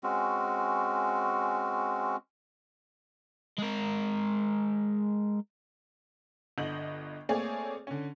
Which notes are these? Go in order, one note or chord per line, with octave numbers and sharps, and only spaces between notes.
G#3 C4 C#4 F#4
G#3 A#4
G1 D3 D#5 G6 F#7
A3 A#3 C4 G#4 C#5 D5
D3 C#4